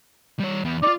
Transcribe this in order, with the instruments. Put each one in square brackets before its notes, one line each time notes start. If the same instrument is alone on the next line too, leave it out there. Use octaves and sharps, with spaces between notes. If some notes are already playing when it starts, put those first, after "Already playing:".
[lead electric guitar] G3 C#5
E2 B3
[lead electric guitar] D#4 F4 [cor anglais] D5